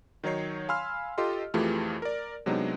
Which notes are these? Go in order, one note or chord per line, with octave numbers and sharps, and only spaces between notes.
D#3 F#3 D#4 C#5 C7
F5 G#5 B5 C6 E6 F6
F4 G4 A4 D#5 C6
F2 E3 A3 F4 G4 G#4
A#4 D5
C3 F#3 G#3 B3 D4 D#4